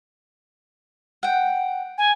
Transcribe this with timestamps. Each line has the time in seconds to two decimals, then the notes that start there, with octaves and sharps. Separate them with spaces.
1.23 F#5 G5
1.98 G#5